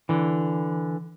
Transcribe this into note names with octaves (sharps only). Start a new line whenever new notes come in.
D3 E3